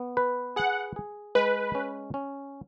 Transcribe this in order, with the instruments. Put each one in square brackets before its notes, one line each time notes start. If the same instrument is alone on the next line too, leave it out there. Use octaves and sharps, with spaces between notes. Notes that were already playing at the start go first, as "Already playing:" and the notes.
Already playing: [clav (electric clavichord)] B3
B4
[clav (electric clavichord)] G#4 [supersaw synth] F#5
[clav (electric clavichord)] G#4
[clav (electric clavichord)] G#3 [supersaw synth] B4
[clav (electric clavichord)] C#4
C#4